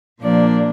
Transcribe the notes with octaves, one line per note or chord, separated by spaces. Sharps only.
A#2 F3 A#3 D4 D5